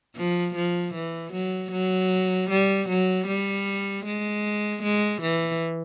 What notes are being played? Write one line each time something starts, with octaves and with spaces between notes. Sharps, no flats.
F3
F3
E3
F#3
F#3
G3
F#3
G3
G#3
G#3
E3